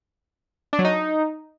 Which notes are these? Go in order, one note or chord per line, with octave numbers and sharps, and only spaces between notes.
D4
F#3
D#4